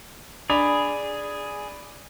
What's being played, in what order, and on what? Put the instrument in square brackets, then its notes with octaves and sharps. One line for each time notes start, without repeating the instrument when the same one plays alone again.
[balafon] D4 [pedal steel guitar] G#4 [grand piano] D5 B5 F7